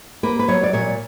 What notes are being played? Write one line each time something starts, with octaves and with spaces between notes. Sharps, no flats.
A#3 B4
B4
F#3 C#5
D5
A#2 C#5